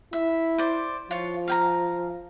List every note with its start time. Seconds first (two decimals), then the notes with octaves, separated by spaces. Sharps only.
0.13 E4 E5
0.58 C5 D5
1.11 F3 F4 C#5
1.48 F5 G5 A#5